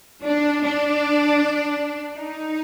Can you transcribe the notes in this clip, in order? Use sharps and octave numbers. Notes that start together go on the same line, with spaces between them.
D4
D4
D#4